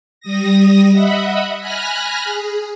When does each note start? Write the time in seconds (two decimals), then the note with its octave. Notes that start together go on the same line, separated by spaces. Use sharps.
0.20 G3 D#6 A#6
0.91 D#5 E5 F#5 B5
1.60 G#5 B5 F6 F#6 A#6
2.24 G#4